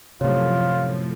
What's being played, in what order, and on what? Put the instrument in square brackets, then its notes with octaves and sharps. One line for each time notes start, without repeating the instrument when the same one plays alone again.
[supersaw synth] F#2 A2 F3 [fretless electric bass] C3 A3 [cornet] F4 [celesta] C#5